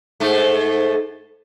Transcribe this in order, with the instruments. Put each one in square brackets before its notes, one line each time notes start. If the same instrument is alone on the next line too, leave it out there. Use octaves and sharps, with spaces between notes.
[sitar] G#2 A3